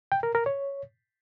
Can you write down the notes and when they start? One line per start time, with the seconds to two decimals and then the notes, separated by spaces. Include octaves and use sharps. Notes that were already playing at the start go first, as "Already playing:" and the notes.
0.12 G5
0.23 A#4
0.35 A#4
0.46 C#5